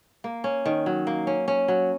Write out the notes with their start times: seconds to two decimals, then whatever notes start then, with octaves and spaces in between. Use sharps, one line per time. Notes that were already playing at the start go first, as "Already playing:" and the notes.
0.24 A#3
0.44 C#4
0.66 D#3
0.86 F#3
1.07 A#3
1.27 C#4
1.48 C#4
1.68 F#3